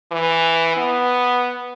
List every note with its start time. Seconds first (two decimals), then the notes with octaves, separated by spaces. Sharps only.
0.11 E3
0.77 B3